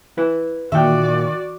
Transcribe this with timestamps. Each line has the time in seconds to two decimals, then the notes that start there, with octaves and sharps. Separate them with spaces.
0.18 E4 B4
0.72 A#2 D#3 F#4 D5 E5 G5